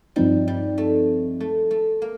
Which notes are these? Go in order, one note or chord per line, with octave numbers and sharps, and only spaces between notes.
G2 F3 G3 C4 D#4
G3
A3
A3
A3
A#3